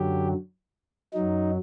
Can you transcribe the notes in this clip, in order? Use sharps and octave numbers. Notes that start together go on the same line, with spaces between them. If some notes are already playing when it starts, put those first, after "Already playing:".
Already playing: F#2 D3 F#3 G4
F#2 F#3 D#4